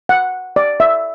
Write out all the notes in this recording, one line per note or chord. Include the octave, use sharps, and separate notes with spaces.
F#5
D5
E5